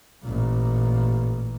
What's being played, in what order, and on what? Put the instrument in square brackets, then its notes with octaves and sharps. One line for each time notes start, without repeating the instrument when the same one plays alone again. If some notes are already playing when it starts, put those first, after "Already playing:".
[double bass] A1 A#2